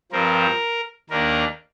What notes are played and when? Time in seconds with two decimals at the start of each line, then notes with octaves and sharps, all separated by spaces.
0.12 G2 F3 C4 A#4
1.10 D#2 D#3 A#3 D4 A#4